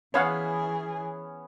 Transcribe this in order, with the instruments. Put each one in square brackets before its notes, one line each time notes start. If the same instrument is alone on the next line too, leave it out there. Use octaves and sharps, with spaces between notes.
[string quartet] E3 G#4 [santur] B3 C#4 [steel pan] C#5 F5 F#5